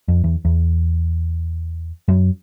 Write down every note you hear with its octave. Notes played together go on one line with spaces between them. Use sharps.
F2
E2
E2
F#2